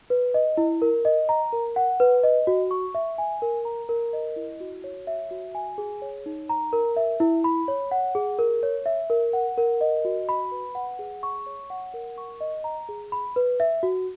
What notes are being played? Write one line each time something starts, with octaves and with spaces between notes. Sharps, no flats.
B4
D#5
E4
A#4
D#5
A#5
A#4
F#5
B4
D#5
F#4
C#6
E5
G#5
A#4
A#5
A#4
D#5
E4
F#4
C#5
E5
F#4
G#5
G#4
C#5
D#4
A#5
A#4
E5
E4
B5
C#5
F#5
G#4
A#4
C#5
E5
A#4
F#5
A#4
D#5
F#4
B5
B4
F#5
G#4
C#6
C#5
F#5
A#4
C#6
D#5
A#5
G#4
B5
B4
E5
F#4